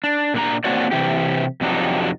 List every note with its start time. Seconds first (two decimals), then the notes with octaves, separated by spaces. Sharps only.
0.04 D4
0.34 A#2 D4 A#5
0.64 A#3 C4 D4 F#4 C#5 D5
0.91 C3 E3 G4
1.61 F2 C3 F#3 D4 D#4